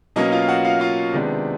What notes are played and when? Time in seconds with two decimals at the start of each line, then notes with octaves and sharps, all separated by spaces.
0.16 B2 F#3 A#3 C#4 D#5
0.32 F4 F5
0.48 F#4 F#5
0.64 F4 F5
0.80 F4 F5
1.13 C3 D#3 G#3 B3 D4